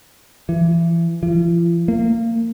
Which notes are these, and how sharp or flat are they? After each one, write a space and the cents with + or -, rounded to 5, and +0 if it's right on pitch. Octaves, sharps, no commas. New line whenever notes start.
E3 +30
F3 -45
A#3 -25